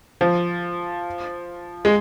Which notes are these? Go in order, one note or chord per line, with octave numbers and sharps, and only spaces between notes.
F3
G#3